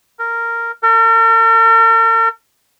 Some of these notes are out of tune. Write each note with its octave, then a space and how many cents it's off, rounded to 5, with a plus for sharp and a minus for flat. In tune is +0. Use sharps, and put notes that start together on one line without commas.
A#4 -10
A#4 -45